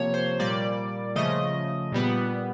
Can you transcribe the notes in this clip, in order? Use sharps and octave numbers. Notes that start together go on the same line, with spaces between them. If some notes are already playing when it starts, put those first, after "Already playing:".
Already playing: C3 F3 A#3 C#5
C5
A#2 G3 A#3 D5
C#3 F3 A3 D#5
A#2 G3 B3